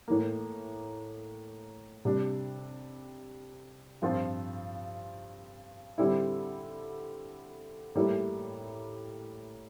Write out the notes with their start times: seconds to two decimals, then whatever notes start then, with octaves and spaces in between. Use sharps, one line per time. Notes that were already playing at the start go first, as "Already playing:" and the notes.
0.08 A2 E3 A#3
2.05 C3 G3 D4
4.02 G2 F3 C4 F4
5.98 D3 G3 C4 E4
7.95 A2 E3 G3 A#3 E4